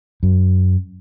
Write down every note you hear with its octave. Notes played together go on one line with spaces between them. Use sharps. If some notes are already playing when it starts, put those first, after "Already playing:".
F#2